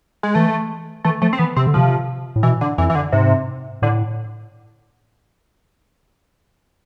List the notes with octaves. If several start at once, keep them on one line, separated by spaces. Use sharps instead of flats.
G#3
E3 A3
E3 A3
F3 A3
C4
E3 B3
C3 C4
D3
C3 F3
A2
B2 E3
D3
F2 E3
E3
D3
G#2 C3
A2 D3